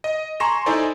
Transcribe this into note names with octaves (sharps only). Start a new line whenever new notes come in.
D#5
G#5 A#5 C6 C#6 A#6 E7
D#4 E4 A4 C5 D5 G#5